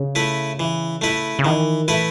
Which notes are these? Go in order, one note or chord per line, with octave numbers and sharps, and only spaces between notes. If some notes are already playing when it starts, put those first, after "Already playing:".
Already playing: C#3
A3 E4 B4
E3
A3 E4 B4
C#3
D#3 E3
E3 A3 E4 B4